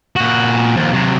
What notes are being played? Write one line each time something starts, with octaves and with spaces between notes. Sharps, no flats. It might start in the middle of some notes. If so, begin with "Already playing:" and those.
A#2 F#4
D#2 F3
C3 F#3